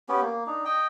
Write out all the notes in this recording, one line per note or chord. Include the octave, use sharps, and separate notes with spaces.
B3 C#4 G4
A#3
D4 D#4
D#5 G5